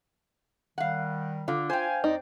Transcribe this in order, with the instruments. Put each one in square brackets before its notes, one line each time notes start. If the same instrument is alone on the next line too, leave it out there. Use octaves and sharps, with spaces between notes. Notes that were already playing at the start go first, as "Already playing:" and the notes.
[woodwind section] D#3 G3 [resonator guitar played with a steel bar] F5 F#5
[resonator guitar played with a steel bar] D3 [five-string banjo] F4
[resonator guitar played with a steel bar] C5 G5 [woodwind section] F5 G#5
[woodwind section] F2 D5 [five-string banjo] D#4